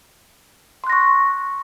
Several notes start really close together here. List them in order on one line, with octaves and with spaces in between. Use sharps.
C6 F#6 A#6 C#6